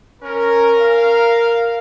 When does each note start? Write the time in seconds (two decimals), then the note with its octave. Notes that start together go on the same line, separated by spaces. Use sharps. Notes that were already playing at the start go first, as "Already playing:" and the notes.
0.22 C#4 A#4
0.78 F5